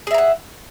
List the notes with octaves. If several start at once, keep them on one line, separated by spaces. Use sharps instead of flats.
G#4 E5 F#5 A#5